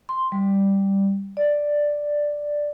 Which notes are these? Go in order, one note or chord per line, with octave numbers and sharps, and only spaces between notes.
C6
G3
D5